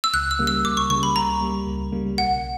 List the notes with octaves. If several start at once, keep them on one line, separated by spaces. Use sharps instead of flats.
E6
C#2 F#6
E6
C#3 G3 A#3
E6
C#2 D6
C#6
C#3 G3 A#3 C#6
B5
C#2 A#5
C#3 G3 A#3
C#2
C#3 G3 A#3
B1 F#5